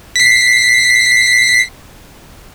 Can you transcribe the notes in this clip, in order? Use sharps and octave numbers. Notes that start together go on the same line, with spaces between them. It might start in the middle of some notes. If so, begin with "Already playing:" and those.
B6 C7